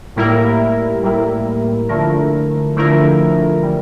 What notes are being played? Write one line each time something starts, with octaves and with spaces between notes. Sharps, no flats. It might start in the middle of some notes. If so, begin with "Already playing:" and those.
A2 G3 A#3 E4 A#4
A2 G3 A#3 E4 A#4
D3 F3 A3 E4 A#4
D3 F3 A3 E4 A#4
E3 G3